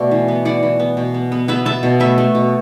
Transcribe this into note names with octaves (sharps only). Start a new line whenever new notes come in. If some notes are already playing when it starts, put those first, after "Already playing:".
Already playing: B2 A3 D5
E3
B3
E3 D5 F#5
E3
B3
B2
B3
B3
B3 B4 E5
B3 E5 A5
B2
A3 B4 E5
A3
B2